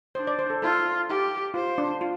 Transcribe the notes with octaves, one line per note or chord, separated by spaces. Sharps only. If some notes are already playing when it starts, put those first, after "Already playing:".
D4 C5
D5
C5
A4
F4 A4
G4
F4 C5
D4
F4